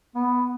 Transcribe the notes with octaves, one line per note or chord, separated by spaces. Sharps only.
B3